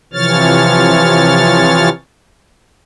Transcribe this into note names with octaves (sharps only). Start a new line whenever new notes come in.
C3 E3 F3 C#5 F6 A6